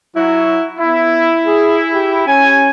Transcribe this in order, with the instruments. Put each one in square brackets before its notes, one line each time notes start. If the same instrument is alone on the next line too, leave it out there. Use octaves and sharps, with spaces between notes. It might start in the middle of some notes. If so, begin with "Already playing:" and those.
[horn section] F#3 F#4 [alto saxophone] E4
[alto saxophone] B3 [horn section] E4
[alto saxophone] G#4
G4
[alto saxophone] C#4 [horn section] G#5